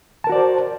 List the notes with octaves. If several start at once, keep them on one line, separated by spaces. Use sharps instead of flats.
F#4 A#4 C5 D5 A5